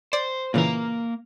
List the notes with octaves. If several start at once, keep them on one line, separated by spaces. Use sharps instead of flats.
C5 D5
A#2 C#3 E3 A#3 A#5